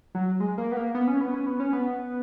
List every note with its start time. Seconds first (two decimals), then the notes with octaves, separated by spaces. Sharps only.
0.15 F#3
0.40 G#3
0.58 A#3
0.72 B3
0.76 A#3
0.95 B3
1.08 C#4
1.21 B3
1.34 C#4
1.46 B3
1.60 C#4
1.73 B3